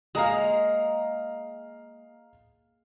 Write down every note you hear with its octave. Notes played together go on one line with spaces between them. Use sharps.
G#3 A#3 F5 A#5 D#6